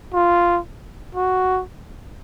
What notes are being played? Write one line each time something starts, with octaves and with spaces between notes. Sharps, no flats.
F4
F#4